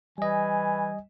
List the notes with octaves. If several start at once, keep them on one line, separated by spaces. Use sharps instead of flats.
E3 G3 D#5 G#5